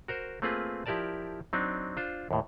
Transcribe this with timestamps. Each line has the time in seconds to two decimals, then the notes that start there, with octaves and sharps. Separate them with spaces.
0.08 F#4 A#4 C5
0.42 A3 A#3 C4 F4 G#4 B4
0.86 F3 E4 G4 A#4 D5 A5
1.53 F#3 C4 D4 D#4
1.97 D4 F4 C5
2.31 D#2 A2